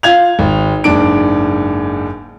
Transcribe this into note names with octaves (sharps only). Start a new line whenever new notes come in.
F4 G#6 F7
G#1
F#1 G#2 D4 D7